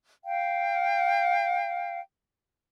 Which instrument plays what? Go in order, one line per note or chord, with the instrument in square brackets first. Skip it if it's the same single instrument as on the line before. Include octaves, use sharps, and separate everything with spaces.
[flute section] F5 G5